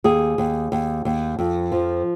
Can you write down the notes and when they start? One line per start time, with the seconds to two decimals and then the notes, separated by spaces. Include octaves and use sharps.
0.04 D#2 G#4
0.38 D#2
0.72 D#2
1.05 D#2
1.39 F2
1.72 F3